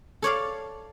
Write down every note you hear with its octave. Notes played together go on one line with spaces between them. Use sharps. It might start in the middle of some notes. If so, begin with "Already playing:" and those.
A4 C#5 D5 F5